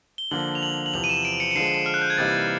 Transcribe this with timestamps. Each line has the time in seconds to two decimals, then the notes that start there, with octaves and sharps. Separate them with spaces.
0.18 G7
0.31 D3 F3 A#3 F#7
0.55 F7
0.62 F#7
0.86 F#7
0.94 E2 C3 F3 F7
1.04 D#7
1.09 E7
1.25 D7
1.40 C#7
1.51 C#7
1.55 D3 F3 G#3 C7
1.86 F6
1.94 F#6
2.01 G6
2.10 G#6
2.18 C3 E3 G3 A#3 D#4 A6